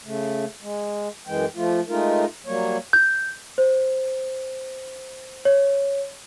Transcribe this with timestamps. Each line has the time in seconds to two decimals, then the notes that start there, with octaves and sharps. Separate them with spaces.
0.05 C#3 A3
0.61 G#3
1.27 F#2 E3 G#3 G5
1.56 F3 A3 F4
1.89 G#3 A3 D#4 F4 A#4
2.46 F#3 G3 A#3 C#5
2.93 G6
3.58 C5
5.45 C#5